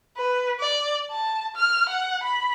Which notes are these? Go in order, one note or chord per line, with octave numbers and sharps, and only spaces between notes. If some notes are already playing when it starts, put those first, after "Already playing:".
B4
D5
A5
F6
F#5
B5